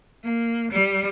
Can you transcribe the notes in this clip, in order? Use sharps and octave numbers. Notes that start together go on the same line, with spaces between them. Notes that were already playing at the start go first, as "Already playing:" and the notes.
A#3
G3